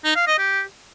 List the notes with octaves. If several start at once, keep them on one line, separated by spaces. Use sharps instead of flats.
D#4
F5
D#5
G4